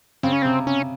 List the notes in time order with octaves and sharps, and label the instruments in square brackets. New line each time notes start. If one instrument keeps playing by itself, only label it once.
[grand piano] C#3 [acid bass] C4
[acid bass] C#4
[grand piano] C3 [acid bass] C4
[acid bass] C#4